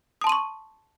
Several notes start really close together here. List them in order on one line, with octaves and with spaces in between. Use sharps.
D#6 A5 C6 D#7 C#6